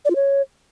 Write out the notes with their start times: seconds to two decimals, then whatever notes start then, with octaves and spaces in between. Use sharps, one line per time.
0.05 D5
0.10 F4
0.16 C#5